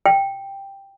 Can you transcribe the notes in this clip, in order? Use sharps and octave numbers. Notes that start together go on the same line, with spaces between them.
G5